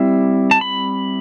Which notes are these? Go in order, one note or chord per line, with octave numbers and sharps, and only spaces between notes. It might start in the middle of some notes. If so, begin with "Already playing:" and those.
Already playing: G3 C4 E4
A5
B5